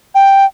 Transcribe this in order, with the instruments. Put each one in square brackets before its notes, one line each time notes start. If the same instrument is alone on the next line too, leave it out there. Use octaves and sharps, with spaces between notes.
[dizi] G5